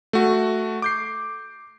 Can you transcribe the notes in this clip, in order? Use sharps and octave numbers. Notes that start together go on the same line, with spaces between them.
A3 F#4
D6 G6 C7